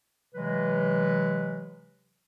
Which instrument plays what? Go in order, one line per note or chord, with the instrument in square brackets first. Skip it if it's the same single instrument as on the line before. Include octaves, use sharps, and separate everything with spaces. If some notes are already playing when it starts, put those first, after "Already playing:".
[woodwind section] C3 E3 F#3 G#3 B4